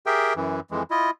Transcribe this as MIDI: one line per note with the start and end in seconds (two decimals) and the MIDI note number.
0.06 0.34 67
0.06 0.34 68
0.06 0.34 70
0.06 0.34 76
0.06 0.34 79
0.36 0.60 42
0.36 0.60 52
0.71 0.83 41
0.71 0.83 52
0.71 0.83 56
0.91 1.10 64
0.91 1.10 65
0.91 1.10 75